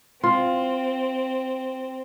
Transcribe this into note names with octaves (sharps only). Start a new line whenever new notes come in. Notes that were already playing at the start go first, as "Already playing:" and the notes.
C4 F4